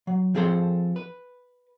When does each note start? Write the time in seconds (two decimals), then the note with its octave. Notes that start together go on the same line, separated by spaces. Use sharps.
0.07 F#3
0.35 F3 C4 G#4 A4 C5
0.96 B4